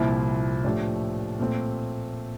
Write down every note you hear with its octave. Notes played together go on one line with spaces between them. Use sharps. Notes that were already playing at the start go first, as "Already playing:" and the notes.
Already playing: C2 A#2 F3 C4 E4
A2 F3 A3 D4 G4
A#2 A3 C4